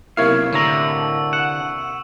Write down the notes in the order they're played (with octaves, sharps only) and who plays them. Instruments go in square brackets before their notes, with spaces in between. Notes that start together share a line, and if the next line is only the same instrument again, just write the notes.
[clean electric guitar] B1 C#5 F5 [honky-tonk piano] C3 A#3 E4
[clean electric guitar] A2 A#5 [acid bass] D3 [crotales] C#6 E6
[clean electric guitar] F#5 [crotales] E7